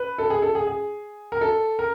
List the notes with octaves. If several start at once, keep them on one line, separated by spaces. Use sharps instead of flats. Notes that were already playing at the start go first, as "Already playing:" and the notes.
Already playing: B4
A4
G#4
A4
G#4
G#4
A#4
A4
A#4